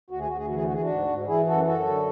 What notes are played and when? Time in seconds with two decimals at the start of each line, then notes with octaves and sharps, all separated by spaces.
0.10 D2 F#4
0.19 G#4
0.28 D2 F#4
0.37 G#4
0.46 F#4
0.50 E3 G#4
0.64 F#4
0.70 E3 G#4
0.82 D4 F#4
0.88 G#2
1.08 G#2
1.27 E3 E4 G#4
1.47 F#2 F#4 A4
1.66 F#2 F#4 A4
1.86 D3